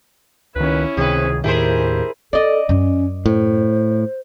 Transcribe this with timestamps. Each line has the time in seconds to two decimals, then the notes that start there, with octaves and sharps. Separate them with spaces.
0.56 C#2 D#3 C#4 E4 B4
0.97 C#2 C3 D#3 C4 G#4 B4
1.44 D#2 A2 D#3 E4 G4 G#4 A#4 C5
2.33 C#4 A4 D5 D#5
2.69 F#2 C#4
3.26 A2 C5